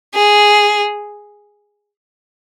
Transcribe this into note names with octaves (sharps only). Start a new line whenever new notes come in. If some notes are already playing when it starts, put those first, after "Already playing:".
G#4